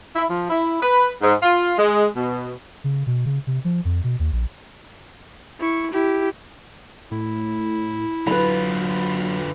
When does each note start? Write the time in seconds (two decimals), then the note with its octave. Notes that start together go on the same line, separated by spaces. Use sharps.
0.15 E4
0.29 F3
0.50 E4
0.82 B4
1.22 G#2
1.41 F4
1.77 G#3
2.15 B2
2.84 C#3
3.07 B2
3.26 C#3
3.47 C3
3.65 F3
3.85 F2
4.04 B2
4.20 D#2
4.32 A#1
5.59 E4 C#6
5.92 E4 G4
7.11 A2 E4
8.27 D3 F#3 F4 B4 B5